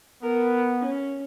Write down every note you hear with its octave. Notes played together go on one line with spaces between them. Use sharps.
B3 A#4
C#4